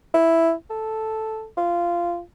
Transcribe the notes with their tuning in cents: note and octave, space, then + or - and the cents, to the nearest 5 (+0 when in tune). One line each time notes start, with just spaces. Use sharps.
E4 +0
A4 -5
F4 -15